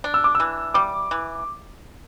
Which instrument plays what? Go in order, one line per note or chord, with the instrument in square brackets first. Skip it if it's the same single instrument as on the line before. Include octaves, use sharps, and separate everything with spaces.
[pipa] D4
[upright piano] E6
D6
[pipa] E3 [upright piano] E6
[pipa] G3 [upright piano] D6
[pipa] E3